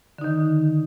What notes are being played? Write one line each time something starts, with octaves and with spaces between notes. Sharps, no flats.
D3 D#3 D#4